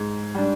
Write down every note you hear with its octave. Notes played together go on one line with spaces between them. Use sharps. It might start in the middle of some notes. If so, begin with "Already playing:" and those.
Already playing: G#2
G3 D4